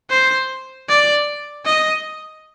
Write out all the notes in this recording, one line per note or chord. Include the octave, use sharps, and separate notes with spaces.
C5
D5
D#5